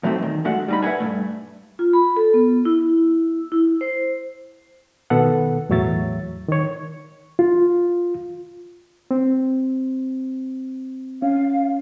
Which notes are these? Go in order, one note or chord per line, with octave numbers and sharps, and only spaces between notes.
A2 F3 F#3 A3 C4 D#4
E2 D#3
F#2 G#3 A3 D4 F#4 F#5
G3 D#4 B5
B4 E5 F#5 G#5
G2 G#3 A3
F4
B5
A4
B3
E4
E4
C5
B2 D#3 B3 A4 B4 F#5
E2 A2 F#3 C#5 E5 A6
D#3 C#5
F4
C4
C#4 F5